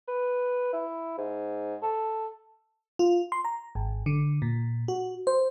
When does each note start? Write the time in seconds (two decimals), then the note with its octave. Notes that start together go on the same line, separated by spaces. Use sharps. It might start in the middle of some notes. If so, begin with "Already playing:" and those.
0.08 B4
0.73 E4
1.18 G#2
1.83 A4
2.99 F4
3.32 C6
3.45 A#5
3.75 G#1
4.06 D3
4.42 A#2
4.88 F#4
5.27 C5